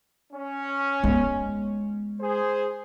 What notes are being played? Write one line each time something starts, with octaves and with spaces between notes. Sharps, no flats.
C#4
G#3 B3
G#4 C5